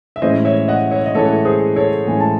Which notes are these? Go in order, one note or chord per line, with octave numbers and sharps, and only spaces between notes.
E5
A2 E3 G#3 C#4 E4 C5 D#5
C#5 E5
D#5 F#5
C#5 E5
D#5
A2 E3 G#3 C#4 E4 A4 C#5
G#4 C5
A4 C#5
A2 E3 G#3 C#4 E4 G#5
A5